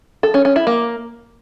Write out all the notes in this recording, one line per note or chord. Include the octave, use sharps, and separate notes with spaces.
A4
C#4
C#4
E4
A#3